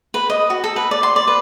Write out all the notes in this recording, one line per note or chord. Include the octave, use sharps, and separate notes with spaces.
B4
D#5
F#4
A4
B4
D5
C6
D5
B4